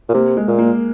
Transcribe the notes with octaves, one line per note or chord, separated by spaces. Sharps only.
A#2
C3 A#3
G#3
A#2
A#3